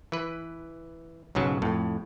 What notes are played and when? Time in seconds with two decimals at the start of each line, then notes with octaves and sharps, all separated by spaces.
0.12 E3 B4
1.35 B1 G#2 C#3 F#3
1.62 F2 A2